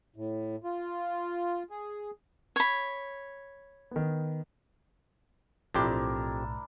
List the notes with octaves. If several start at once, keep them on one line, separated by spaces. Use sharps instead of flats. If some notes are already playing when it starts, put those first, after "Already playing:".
A2
F4
G#4
C#5 B5
D#3 B3
B1 F2 A2 C4 D4 E4 G4 A#4